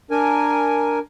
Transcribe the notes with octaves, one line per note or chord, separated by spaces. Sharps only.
D4 A#4 G#5